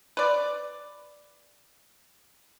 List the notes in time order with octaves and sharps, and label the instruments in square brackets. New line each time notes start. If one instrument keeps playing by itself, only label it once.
[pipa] B4 D5